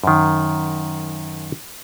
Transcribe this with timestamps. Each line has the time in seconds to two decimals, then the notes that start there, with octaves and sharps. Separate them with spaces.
0.04 F#2 D#3